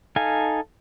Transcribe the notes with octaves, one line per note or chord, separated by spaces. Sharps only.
D#4 A4 F5 G#5